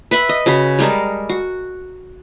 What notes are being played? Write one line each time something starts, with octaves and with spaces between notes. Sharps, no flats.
B4 E5 F#5 B5
D#5
C#3 F#4 A5 B5
G3 G#3 A#4 A5
F#4